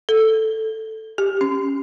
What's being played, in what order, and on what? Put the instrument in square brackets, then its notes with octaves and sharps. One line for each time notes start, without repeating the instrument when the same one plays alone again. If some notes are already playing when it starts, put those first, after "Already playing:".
[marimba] A4
G4
C#4